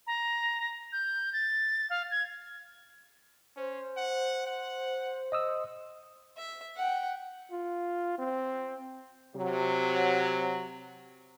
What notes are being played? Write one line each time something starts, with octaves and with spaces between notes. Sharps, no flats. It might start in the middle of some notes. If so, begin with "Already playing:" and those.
A#5
G6
A6
F5
G#6
C#4 C5
F#5
F#5
D#5 D#6 E6
E5
F#5 G5
F4
C4
C3 F#3